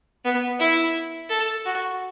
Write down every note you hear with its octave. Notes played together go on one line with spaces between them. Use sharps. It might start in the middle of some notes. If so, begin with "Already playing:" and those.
B3
E4
A4
F#4